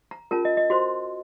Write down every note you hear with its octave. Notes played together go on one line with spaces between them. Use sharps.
A#5
C#4 F4 A#4 A5
D#5
D#5
F#4 C5 C6